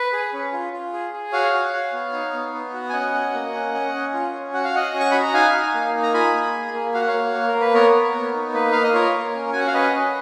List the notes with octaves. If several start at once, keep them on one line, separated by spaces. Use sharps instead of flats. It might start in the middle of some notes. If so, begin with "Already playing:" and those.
Already playing: B4
G#4
C#4
F4
F4
G#4
G#4
F#4 C#5 F5
F#4
F#4
B3
D#4
B3
B3
F#4
G#5
C#4 D#5 F#5
F#4
A#3
C#4
C#4
C#4
F4
C#4
F#4 F#5
F5
F#4 D#5 F#5
C#4
C#6
F#4 B5
A#5
D#4 F5 G#5
D#4
A#3
D#4
A#5
F4 G#5 B5
A#3
G#4
A#3
F#4 F5
F#5
C#5 F5
A#3
A#3
A#4
A#3
B4
B3 A#4 C#5
B3
B3
D#4
A#3 B4
A#3 F5
D#5
F4 A#4 C#5
A#3
C#4
F#4 G#5
F#5
F5
C#4 B4 D#5
C#4